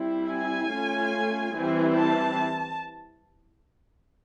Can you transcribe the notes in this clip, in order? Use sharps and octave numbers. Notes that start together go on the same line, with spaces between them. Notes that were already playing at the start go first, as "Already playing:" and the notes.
Already playing: G3 C4 E4
G#5
A3 C#4 F4
E3 G3 C4 E4
A5